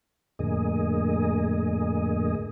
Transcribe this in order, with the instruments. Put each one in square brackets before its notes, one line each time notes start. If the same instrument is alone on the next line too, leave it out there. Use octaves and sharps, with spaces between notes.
[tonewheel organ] F2 A2 D3 A#3 G#4 D#5